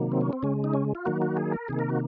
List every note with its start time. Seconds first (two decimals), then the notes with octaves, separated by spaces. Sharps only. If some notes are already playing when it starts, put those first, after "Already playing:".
Already playing: C3 D#3 F#3 A#3
0.12 C4
0.21 C#4
0.33 C4
0.43 C#3 G#3 C#4
0.64 D#4
0.74 C#4
0.95 F4
1.05 D#3 F#3 A#3 F#4
1.22 F#4
1.37 G#4
1.52 A#4
1.68 C3 D#3 A#3 G#4
1.79 A#4
1.89 F#4